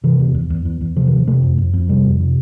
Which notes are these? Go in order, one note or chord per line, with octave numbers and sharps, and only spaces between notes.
C3 E3
E2
E2
E2
E2
E2
C3 F3
E3
E2
F3
C3 A3
F2
F2
F2
C3 G3
F2
C3